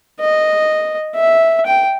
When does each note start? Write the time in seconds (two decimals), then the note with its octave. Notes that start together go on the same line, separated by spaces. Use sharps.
0.20 D#5
1.16 E5
1.66 G5